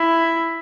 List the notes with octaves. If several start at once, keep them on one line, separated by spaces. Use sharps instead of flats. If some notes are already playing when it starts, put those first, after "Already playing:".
Already playing: E4